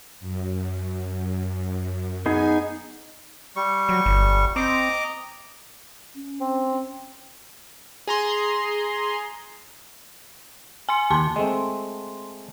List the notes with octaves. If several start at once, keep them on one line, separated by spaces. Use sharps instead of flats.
F#2
B3 D#4 G#4 G#5
G3 C#6
F#3
G1
C4 D#5 A#5 D6
C#4
C4
G#4 A#5 C6
G#5 C6 C#7
D#2 G4 A5 C6
G#3 A3 C4